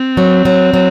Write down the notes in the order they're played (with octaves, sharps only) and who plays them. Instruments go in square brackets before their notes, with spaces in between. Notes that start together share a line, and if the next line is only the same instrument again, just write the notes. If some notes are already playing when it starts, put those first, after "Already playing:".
Already playing: [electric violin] C4
[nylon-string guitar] F#3
F#3
F#3